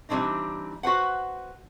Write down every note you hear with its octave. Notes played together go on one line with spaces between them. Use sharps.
E3 G3 A3 C4 D4 D#4
F#4 B4 C5 F#5